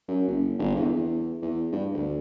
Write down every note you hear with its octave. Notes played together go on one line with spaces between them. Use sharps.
F#2
F#1
G1
E2
E2
E2
G2
D2